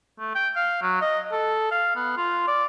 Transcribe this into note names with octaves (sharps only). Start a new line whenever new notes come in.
A3
G5
F5
F#3
D#5
A4
F5
B3
F4
D5